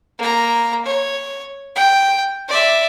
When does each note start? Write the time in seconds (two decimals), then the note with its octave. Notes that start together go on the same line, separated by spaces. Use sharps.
0.19 A#3 A#5
0.86 C#5
1.76 G5
2.49 D5 E5